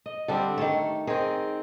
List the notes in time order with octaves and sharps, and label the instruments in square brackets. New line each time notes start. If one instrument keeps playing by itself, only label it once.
[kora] D#5
[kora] D3 G3 C4 [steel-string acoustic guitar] D4 A4
[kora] D#3 A4 C#5 [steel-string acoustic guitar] A3
[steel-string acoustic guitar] D#3 C4 [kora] G#4